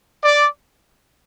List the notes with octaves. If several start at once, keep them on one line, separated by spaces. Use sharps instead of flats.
D5